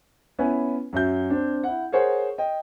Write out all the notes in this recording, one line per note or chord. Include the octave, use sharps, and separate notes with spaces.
B3 C#4 E4 B4 G#5
F#2 F#4 E5 G6
C4 D4
E4 F#5
G#4 A#4 C5 C#5 F#5
D#5 G5